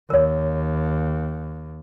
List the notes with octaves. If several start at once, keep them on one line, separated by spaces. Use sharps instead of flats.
D#2 A#4 C#5